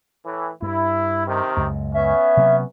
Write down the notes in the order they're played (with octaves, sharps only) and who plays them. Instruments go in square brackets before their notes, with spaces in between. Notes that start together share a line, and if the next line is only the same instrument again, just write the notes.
[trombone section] A2 E3
[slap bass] G2 [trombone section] E4
[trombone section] C3 D#3
[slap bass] C#2 F#2
[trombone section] B3 C#4 [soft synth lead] E5
[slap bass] C3 F#3 A#3